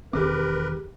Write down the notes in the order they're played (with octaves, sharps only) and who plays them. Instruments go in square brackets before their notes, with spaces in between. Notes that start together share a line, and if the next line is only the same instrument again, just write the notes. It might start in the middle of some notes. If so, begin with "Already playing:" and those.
[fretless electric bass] E1 D#3 C4 [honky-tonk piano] G4 G#4 D6 [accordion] A#4 B4